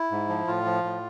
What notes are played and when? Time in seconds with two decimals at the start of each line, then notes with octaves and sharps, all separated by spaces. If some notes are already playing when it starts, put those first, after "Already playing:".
Already playing: E4
0.11 G#2
0.29 F3
0.47 A2 F4
0.65 F3
0.84 A2